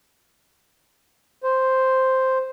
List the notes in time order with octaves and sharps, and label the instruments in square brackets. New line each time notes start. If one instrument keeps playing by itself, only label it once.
[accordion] C5